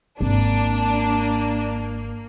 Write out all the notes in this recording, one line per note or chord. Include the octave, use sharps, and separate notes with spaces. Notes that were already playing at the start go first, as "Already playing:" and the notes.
G#1 A#3 D4